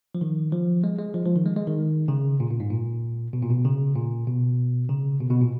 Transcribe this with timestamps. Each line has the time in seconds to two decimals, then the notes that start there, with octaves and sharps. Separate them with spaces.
0.15 F3
0.21 D#3
0.52 F3
0.84 G#3
0.99 G#3
1.14 F3
1.26 F3
1.36 D#3
1.46 G#3
1.56 G#3
1.67 D#3
2.08 C#3
2.40 A#2
2.50 A#2
2.60 G#2
2.71 A#2
3.33 B2
3.42 A#2
3.50 B2
3.65 C#3
3.96 A#2
4.27 B2
4.89 C#3
5.20 B2
5.30 B2
5.42 A#2